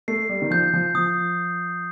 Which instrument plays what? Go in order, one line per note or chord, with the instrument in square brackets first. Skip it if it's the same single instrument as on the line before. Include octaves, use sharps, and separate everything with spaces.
[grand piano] A3 [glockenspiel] C7
[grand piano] G3
D#3
[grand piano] F3 [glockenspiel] G6
[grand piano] F3
[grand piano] F3 [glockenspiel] D#6